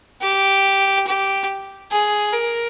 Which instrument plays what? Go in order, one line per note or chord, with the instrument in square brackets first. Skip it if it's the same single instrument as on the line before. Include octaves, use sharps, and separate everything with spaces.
[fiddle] G4
G4
G#4
A#4